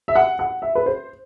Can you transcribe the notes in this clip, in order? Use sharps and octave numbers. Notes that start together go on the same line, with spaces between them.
E5
F#5
F#5
E5
B4
C5